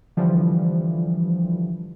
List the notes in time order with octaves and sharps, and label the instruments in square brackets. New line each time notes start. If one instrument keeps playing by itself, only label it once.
[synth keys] D3 E3 F3 G3